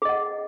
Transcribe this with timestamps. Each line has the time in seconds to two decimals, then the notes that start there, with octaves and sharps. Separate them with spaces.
0.02 G#4
0.05 D#5
0.09 F#5